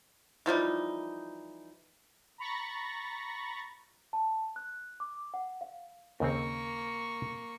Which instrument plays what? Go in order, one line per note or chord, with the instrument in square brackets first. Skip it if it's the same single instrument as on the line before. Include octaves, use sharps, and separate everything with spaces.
[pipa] E3 F3 G3 D#4
[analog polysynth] A#5 B5 C#6 A6 A#6
[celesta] A5
F#6
D6
F#5
F5
[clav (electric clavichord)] D#2 C#3 C4 [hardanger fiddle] A#3 C#6